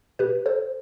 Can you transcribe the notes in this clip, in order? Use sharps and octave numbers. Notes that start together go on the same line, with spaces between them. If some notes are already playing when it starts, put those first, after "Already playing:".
B2 G4 B4
A4 C5